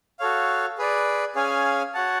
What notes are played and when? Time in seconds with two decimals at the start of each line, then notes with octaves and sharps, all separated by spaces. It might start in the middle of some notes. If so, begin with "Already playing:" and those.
0.19 F#4 A4 C#5 F5
0.78 G#4 B4 D5
1.35 C#4 G#4 C#5 F5 G#5
1.94 F#4 C#5 F#5 A5